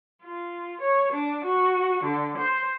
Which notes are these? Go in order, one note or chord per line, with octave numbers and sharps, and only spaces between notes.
F4
C#5
D4
F#4
D3
C5